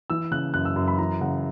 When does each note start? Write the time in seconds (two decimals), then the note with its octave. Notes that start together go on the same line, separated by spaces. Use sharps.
0.10 E3 E6
0.31 C#3 F#6
0.54 F#2 F#6
0.65 E6
0.76 F#2
0.88 B5
0.98 E3 A#5
1.21 C#3 F#5